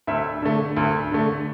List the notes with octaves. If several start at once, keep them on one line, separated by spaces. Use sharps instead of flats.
D2 E5
D3 A3
D2
D3 A3